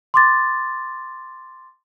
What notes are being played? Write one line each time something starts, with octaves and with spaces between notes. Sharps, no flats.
C6 D6 A6